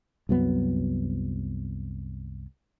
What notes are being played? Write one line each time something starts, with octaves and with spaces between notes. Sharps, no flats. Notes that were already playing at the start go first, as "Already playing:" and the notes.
C2 F#2 F#3 B3